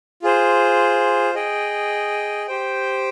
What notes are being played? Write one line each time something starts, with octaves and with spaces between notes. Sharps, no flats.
F4 G#4 C5
G#4 D#5 G5
G4 C5 G5